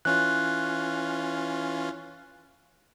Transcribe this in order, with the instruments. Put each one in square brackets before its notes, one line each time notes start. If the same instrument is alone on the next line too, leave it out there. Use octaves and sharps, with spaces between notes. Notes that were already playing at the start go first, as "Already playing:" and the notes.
[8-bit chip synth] E3 C#4 F4 [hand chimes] F#6